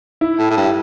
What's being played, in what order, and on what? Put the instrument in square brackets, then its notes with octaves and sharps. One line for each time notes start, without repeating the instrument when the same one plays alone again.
[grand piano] E4
[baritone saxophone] A2
A2
G2